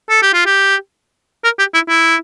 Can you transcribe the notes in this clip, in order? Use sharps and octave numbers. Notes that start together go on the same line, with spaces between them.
A4
G4
F4
G4
A#4
G4
E4
E4